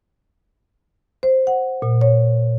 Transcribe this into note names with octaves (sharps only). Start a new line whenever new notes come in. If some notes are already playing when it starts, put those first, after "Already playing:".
C5
F#5
A#2
C#5